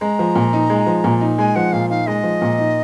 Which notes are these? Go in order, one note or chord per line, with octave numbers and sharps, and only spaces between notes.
G#3 A#5
F3
A#2
D#4
G#3
F3
A#2
D#4
G#3 G#5
F3 F#5
A#2 F5
D#4 F5
G#3 D#5
F3
A#2
D#4